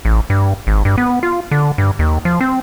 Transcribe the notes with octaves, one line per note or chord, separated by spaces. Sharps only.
A1
G2
G#1
G2
B3
F4
D3
G2
D#2
F3
C4